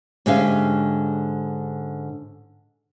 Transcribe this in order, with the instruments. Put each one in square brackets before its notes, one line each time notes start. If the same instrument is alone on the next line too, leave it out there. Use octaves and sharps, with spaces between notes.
[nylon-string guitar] G#2 D3 C#4 G4 E5 F5